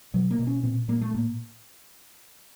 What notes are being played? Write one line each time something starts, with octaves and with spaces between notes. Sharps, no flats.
B2 F#3
A#3
B2
C#4
A#2 C4
A#2 A#3
A3
A2 A#3